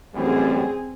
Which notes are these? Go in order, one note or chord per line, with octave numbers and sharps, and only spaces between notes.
A1 F#2 G3 C4 G#4